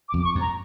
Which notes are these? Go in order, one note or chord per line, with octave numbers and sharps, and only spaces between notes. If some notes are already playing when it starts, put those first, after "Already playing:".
D6
F2
D6
C#6
F2
A#5